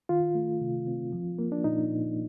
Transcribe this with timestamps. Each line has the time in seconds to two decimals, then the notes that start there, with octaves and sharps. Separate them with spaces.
0.09 D#3 F4
0.35 A3
0.61 C3
0.87 C4
1.12 F3
1.39 A#3
1.52 D4
1.64 A#2 D#4
1.90 A#2